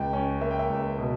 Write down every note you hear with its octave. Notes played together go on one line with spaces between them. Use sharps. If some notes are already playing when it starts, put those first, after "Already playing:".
Already playing: C#2 G5
C#4
A#3 E5
G5
E5
C#2
B2